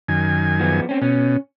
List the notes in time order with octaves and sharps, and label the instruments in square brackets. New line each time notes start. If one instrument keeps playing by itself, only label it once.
[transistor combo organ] F#2 D#3 G#5
[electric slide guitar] F3 B3
C4 C#4
[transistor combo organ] B2 [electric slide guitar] C#4